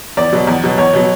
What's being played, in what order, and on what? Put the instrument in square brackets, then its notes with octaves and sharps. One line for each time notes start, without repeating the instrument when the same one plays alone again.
[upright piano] E2 D5
B2 F#3
E2
B2 F#3
E2 C#5
B2 F#3